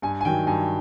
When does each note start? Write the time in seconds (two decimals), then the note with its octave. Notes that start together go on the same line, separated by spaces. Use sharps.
0.02 G2 G#5
0.21 G#5
0.25 D#3 F#3 G5
0.47 G2 G#5